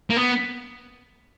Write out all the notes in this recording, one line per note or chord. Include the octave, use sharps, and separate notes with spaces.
A#3
B3